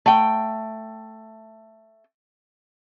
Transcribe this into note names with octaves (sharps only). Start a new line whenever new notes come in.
A3 G5